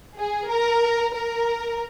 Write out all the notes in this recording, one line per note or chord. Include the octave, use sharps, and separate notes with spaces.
G#4
A#4
A#4